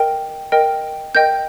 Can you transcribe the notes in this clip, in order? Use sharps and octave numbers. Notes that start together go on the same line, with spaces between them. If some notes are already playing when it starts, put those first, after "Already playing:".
Already playing: A#4 D#5 G5
A#4 D#5 G5
A#4 D#5 G5 G6